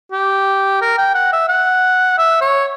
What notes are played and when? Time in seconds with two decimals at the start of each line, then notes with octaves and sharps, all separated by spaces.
0.12 G4
0.81 A#4
0.98 G5
1.15 F#5
1.33 E5
1.49 F#5
2.18 E5
2.41 C#5